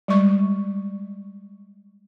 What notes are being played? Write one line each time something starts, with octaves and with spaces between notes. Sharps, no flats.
G3 G#3 C#6